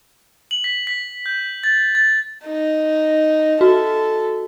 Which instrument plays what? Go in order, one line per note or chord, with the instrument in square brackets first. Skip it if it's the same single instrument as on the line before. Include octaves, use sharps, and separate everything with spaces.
[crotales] F#7
B6
B6
G6
A6
A6
[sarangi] D#4
[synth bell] F#4 [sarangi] A4